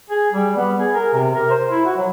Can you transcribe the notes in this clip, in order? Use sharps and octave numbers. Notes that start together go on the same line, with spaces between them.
G#4
G3
B3
G#4
A#4
C3
A#4
C5
E4
F#4
F#3